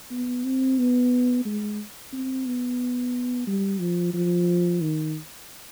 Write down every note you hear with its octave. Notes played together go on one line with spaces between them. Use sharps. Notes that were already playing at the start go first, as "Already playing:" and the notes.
B3
C4
B3
G#3
C4
B3
G3
F3
F3
D#3